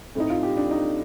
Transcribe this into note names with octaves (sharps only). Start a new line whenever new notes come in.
A2 A3 C4 D#4
F4
G4
D4
D#4